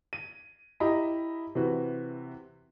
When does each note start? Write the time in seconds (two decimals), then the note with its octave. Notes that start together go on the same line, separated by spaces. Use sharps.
0.13 D#7
0.80 E4 G4 D#5 A#5 B5
1.55 C3 E3 F#4 B4